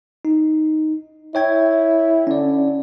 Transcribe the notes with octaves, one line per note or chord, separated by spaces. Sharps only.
D#4
E4 C#5 G5 G#6
D3 C#4 D5